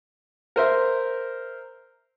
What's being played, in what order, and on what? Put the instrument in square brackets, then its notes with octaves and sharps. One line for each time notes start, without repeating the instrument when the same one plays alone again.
[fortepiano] A#4 C5 E5